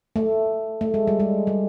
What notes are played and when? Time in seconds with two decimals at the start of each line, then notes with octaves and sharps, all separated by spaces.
0.16 A3
0.81 A3
0.94 G#3
1.07 G3
1.20 G#3
1.47 G3